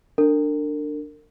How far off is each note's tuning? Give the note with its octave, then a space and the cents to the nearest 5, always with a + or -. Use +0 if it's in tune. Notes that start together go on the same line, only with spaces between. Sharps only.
D4 +10 A#4 -35